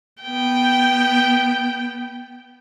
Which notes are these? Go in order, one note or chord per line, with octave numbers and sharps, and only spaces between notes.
B3 G5